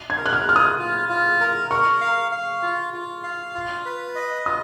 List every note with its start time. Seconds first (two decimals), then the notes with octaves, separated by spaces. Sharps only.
0.10 G#6
0.17 A#4
0.26 F#6
0.33 F6
0.48 F4 F6
0.56 D#6
0.79 F4
1.09 F4
1.40 A#4
1.71 A#4 C#6
2.01 F5
2.32 F5
2.62 F4
2.93 F4
3.23 F5
3.55 F4
3.85 B4
4.15 D#5
4.46 F4 D#6